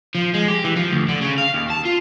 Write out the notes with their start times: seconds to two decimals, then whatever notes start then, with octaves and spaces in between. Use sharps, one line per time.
0.15 F3
0.34 G#3
0.48 G4
0.64 E3
0.76 F3
0.92 D2
1.08 D3
1.21 C#3
1.38 F5
1.54 D#2
1.70 A5
1.85 F4